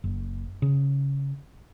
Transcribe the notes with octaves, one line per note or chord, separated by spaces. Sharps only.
F#1
C#3